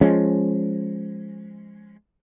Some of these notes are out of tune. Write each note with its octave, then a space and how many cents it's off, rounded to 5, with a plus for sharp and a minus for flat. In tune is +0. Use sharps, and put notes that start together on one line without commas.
F3 +0 G#3 +0 C#4 -5